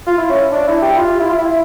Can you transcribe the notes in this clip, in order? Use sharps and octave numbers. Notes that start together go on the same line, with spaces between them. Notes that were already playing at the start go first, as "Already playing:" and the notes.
F4
E4
C#4
D4
E4
G4
F4
E4
F4
E4